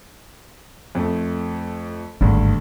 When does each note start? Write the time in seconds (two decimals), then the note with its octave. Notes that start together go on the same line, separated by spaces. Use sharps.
0.95 F2 A3
2.21 G#1 D2 G2